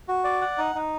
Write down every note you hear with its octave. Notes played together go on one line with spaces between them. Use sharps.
F#4
D5
F#5
D#4
D#4